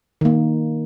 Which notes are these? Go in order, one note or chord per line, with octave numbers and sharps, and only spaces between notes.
D#3 A#3